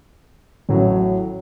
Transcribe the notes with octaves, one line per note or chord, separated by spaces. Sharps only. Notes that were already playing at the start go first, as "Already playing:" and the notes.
A1 A2 F#3